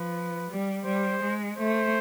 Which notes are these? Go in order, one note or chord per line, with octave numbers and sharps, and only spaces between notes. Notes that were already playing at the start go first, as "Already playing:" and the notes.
Already playing: F3 B4
G3
G3 C5
G#3
A3 C5